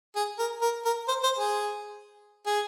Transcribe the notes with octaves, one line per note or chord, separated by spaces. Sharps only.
G#4
A#4
A#4
A#4
C5
C5
G#4
G#4